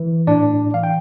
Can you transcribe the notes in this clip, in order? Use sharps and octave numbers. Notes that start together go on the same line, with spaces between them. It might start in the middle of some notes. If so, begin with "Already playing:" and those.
Already playing: E3
A2 D4 D5
E3 F5
G5